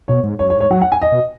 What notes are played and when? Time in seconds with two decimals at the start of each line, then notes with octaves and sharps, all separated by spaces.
0.08 B2 C#5
0.24 G#2
0.39 F#2 C#5
0.50 C#5
0.55 G#2
0.60 C#5
0.71 F#3 F#5
0.82 F#5
0.92 G#5
1.02 D#5
1.12 B2